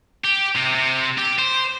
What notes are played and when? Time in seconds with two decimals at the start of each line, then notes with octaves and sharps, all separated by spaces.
0.24 G4
0.56 C3
0.75 C3
1.18 G4
1.39 C5